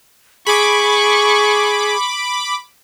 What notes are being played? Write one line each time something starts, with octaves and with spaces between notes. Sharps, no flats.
G#4 B5 C#6 D6